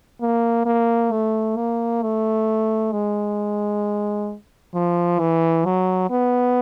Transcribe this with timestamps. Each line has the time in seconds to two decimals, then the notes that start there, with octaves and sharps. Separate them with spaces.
0.21 A#3
0.66 A#3
1.12 A3
1.57 A#3
2.02 A3
2.92 G#3
4.75 F3
5.19 E3
5.65 F#3
6.10 B3